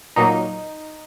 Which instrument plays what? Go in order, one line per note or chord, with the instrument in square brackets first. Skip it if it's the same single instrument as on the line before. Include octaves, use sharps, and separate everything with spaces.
[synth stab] A#2 F#3 A#3 D#4